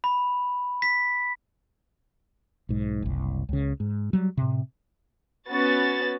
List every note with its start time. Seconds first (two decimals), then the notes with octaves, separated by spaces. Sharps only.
0.04 B5
0.82 B6
2.69 B1 G#2
3.03 F#1 C2
3.49 C#2 C#3
3.80 G#2
4.13 F#3 G3
4.37 A2 C3
5.50 B3 C#4 F#4 A6